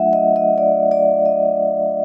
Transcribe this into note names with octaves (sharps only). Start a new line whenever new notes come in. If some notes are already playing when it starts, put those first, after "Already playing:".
Already playing: F#3 A3 D4 F4 E5 F#5
D#5
D#5
D5
D5
D#5